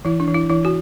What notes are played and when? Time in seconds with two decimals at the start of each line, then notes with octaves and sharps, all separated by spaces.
0.05 E3 E4
0.20 D4
0.27 E3
0.34 E4
0.50 E3 E4
0.65 F#4